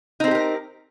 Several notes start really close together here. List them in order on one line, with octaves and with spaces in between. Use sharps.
D#4 C4 A4 G4 A#4